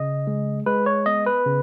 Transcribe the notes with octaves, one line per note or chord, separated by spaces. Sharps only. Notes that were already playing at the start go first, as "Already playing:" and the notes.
Already playing: C#3 D#5
G#3
G#3 B4
C#5
B3 D#5
B4
C#3